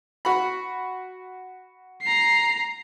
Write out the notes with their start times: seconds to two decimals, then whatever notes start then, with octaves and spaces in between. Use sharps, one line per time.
0.25 F#4 B5
2.02 A#5 C7